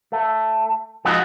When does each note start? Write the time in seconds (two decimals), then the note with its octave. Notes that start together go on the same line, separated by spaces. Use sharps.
0.12 A3
1.05 F3 G#3 B3 D#4 F#4